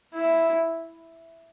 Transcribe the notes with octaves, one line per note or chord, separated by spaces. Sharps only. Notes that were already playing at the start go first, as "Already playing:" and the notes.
E4